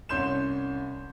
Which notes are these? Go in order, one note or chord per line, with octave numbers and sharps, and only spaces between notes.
C2 C#4 C#5 C6 G6 E7